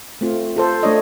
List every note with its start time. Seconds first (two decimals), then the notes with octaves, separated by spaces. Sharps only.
0.21 A3 C4 F4
0.56 F4 A4 C5
0.83 A3 D4 C#5 D#5